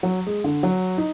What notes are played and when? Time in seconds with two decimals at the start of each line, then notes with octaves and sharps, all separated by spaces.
0.03 F#3
0.27 G#3
0.44 D3
0.63 F#3
0.98 D#4